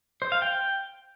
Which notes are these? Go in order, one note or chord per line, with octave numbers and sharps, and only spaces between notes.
C5
F5
G5